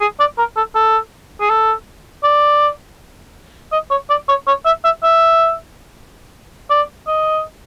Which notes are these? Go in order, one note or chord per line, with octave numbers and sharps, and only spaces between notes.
G#4
D5
A#4
A4
A4
G#4
A4
D5
D#5
C#5
D5
C#5
C#5
E5
E5
E5
D5
D#5